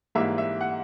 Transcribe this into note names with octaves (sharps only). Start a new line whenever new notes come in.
G#2 E3 G3 A#3 E5
E5
F#5